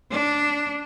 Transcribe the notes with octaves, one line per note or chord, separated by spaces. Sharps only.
D4